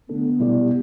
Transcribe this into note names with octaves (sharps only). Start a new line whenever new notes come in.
D3 A3 B3 D4 A4
B2 G3 E4 G4 D5